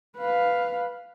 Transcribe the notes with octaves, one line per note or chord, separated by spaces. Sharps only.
B4 F5